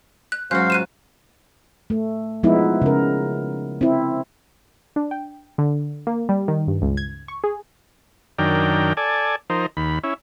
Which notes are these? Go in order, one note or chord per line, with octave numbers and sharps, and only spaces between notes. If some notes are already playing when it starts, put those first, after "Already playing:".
F#6
G#2 F#3 C#4 F#4 C5 F5 F#6
F4 F#6 D#7 E7
A3
F3 G#3 B3 D#4 E4
C#3 A#4
C4 E4
D4
G5
D3
A#3
G3
D#3
G2
C#2
G#6
C#6
G#4
F#2 D#3 D4 A#4 G5
A4 D5 G#5
F3 D#4 A#4 C5
D#2 B5
C#4 E4